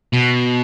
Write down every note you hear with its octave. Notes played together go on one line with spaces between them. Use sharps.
B2